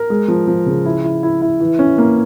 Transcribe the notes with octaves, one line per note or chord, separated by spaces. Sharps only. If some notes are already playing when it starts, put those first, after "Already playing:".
Already playing: A#4
G#3
F3
F3
C#3
E4
E4
E4
E4
E3
C#4
A#3